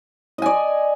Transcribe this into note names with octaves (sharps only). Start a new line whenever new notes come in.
D5 D#5 G#5